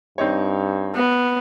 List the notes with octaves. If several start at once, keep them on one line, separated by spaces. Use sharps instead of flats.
G2 C4 D#4 C#5
B3